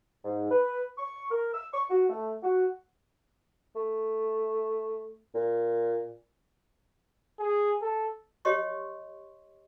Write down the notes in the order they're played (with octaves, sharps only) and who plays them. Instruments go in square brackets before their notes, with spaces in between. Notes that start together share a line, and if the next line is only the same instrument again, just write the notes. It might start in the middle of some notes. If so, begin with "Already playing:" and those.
[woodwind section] G#2
B4
C#6
A#4
E6
C#6
F#4
A3
F#4
[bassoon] A3
A#2
[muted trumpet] G#4
A4
[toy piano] G4 C#5 D#5 C6 C#6